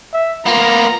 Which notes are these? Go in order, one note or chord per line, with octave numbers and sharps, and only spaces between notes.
E5
A#3 B3 F4 A#5